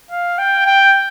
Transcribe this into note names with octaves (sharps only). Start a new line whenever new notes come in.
F5
G5
G5